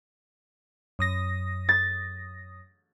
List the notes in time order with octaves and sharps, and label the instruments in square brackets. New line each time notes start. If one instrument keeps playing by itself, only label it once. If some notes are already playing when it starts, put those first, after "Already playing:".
[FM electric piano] F#2 D#6 A#6
[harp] A6